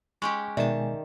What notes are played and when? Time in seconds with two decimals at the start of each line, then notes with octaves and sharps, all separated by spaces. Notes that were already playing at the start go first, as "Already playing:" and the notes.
0.22 G#3 C#4 G4 C#6
0.57 B2 D#3 G#3 D5 E5 G#5 A5